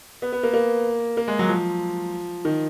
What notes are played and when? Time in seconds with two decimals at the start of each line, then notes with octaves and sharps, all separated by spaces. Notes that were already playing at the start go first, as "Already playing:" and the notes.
0.22 B3
0.32 B3
0.43 A#3
0.54 A#3
1.17 A#3
1.28 G#3
1.39 F#3
1.49 F3
2.45 D#3